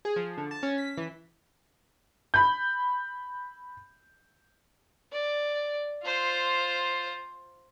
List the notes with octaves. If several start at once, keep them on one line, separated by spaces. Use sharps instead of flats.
G#4
F3
D3
A5
C#4
B6
E3
B5 G6
D5
F4 C5